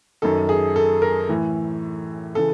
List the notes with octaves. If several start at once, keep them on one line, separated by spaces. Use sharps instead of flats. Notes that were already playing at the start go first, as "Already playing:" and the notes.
F#2 D#3 A4
G#4
A4
A#4
A2 E3
C#3 E3 A4